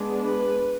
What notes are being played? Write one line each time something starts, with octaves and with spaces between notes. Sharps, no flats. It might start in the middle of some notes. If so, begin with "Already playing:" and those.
Already playing: G#3 B3 D4
B4